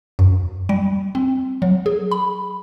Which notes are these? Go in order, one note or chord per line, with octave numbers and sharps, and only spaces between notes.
F#2
G3
C4
F#3
G#4
B5